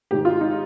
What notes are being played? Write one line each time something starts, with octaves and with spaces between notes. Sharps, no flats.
G#2 D#3 G4
F4
D#4